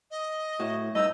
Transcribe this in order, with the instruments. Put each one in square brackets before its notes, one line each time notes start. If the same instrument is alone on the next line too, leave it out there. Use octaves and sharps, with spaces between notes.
[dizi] D#5
[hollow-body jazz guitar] A2 F#4
[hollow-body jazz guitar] G2 G3 D#4 [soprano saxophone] D#5 [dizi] E6